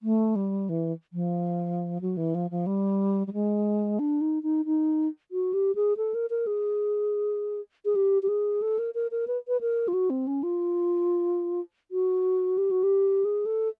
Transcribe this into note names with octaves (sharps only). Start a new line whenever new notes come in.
A3
G3
E3
F3
F#3
E3
F3
F3
G3
G3
G#3
D4
D#4
D#4
D#4
F#4
G4
G#4
A4
A#4
A#4
G#4
G#4
G4
G4
G#4
A4
A#4
A#4
A#4
B4
B4
A#4
F4
F#4
C4
C#4
F4
F#4
G4
F#4
G4
G#4
A4